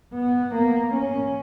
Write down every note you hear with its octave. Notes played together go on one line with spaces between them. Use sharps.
B3
A#3
C#4